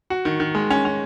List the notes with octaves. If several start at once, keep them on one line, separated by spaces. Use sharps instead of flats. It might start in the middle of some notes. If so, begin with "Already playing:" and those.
F#4
D#3
D#3
G#3
C#4
C#4